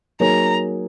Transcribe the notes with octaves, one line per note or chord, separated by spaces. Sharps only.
F#3 A#3 D#4 G#4 C#5 A#5